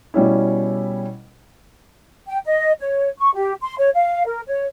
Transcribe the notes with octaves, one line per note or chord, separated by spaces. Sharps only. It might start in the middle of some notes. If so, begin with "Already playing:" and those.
B2 G3 C#4 E4
G5
D#5
C#5
C#6
G4
C6
C#5
F5
A#4
C#5